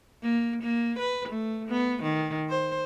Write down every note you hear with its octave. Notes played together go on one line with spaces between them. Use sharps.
A#3
A#3
B4
A3
B3
D#3
C5